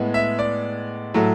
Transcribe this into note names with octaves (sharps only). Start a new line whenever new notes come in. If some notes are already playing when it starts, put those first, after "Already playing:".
Already playing: A2 G#3 B3
E5
D5
A2 F#3 A3